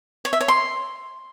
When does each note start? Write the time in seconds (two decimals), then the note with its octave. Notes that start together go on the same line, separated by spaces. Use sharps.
0.25 C#5
0.33 E5
0.41 C#5
0.48 C6